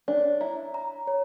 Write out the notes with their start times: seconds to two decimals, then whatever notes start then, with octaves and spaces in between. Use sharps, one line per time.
0.08 D4 C#5
0.41 E4 A#5
0.74 A#5
1.07 C#5